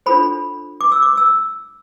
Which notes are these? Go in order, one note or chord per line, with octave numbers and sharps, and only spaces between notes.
D4 F4 A4 C5 B5
D6
E6
D6
E6